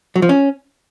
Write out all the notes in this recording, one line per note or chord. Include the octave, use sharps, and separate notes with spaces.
F#3
F3
C#4